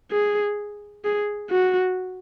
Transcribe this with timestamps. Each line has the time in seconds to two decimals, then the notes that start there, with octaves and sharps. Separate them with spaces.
0.12 G#4
1.04 G#4
1.50 F#4